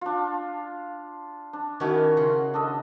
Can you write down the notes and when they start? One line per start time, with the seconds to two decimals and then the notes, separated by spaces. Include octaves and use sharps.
0.01 D4 F4
1.53 D4
1.80 D#3 B3 C#4 E4 F#4
2.17 C#3 C6
2.54 D4 A4 D#5